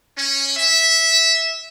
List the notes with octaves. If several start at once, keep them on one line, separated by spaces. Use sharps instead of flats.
C#4
E5